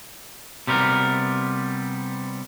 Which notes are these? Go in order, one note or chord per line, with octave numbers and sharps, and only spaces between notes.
C3 G3 B3 A#4